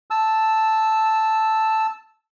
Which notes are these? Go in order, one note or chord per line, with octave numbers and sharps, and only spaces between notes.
A5 E6